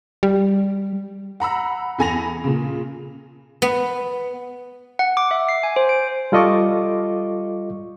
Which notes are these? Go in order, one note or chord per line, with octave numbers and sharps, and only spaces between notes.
G3
F#5 A#5 B5 E6
E2 A4 G#5 B5 A#6 F7
A#2 C#3
B3
F#5
D6
E5
C7
G#5
C5
D7
G3 F4 A4 D#5 C#6 D6